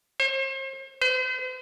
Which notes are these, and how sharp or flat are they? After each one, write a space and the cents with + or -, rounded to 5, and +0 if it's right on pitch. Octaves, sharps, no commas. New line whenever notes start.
C5 +40
C5 -45